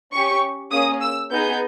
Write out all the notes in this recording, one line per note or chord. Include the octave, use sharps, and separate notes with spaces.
C#4 G4 C#6
A#3 C#4 G#4 D#6
E6
B3 D#4 G#4 G6